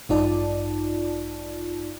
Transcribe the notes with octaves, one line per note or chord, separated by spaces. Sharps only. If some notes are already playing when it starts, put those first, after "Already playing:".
A1 G2 D#4 F4 D5 A5